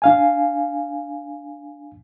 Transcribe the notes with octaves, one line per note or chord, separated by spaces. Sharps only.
D4 F5 G#5